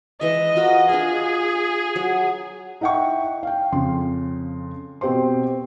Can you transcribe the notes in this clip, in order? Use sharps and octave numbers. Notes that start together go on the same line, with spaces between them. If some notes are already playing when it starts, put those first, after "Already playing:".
E3 G#3 D#5 E5
F4 F#4 A#4
D4 F4 G#4
F#3
D#4 E4 F#5 G5 C#6
F5 G5
F2 C#3 C6
B2 C4 G4 C5 C6